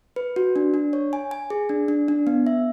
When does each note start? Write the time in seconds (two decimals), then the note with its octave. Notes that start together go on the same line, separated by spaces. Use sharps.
0.16 B4
0.36 F#4
0.56 D4
0.74 D4
0.93 C#5
1.13 G#5
1.31 G#5
1.50 G#4
1.69 D4
1.88 D4
2.08 D4
2.27 B3
2.47 E5